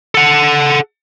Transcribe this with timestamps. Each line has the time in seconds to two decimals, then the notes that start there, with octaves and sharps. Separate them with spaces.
0.15 A4 F#5